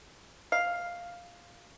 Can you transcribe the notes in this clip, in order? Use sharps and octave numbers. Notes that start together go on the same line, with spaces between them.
F5